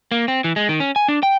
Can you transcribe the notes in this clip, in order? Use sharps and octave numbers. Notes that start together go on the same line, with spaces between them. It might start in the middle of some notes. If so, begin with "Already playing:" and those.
A#3
C4
E3
G#3
D#3
C#4
G#5
D4
G5